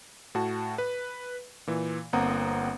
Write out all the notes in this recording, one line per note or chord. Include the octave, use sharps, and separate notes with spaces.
A2 F#4 A5
B4
A#2 E3
G1 A#3 C4 F#5 A#5 D#6